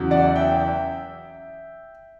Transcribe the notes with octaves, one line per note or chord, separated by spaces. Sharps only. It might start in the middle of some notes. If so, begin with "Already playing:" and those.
Already playing: E2 C#3 F#3
D5 F#5
E5 G5